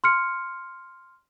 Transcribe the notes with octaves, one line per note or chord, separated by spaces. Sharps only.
C6 F6 C#7